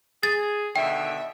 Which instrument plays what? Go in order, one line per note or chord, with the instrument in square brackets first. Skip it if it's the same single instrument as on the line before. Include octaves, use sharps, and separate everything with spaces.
[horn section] G#4 [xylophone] A6
[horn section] B2 D3 D#3 [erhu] E5 [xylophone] G5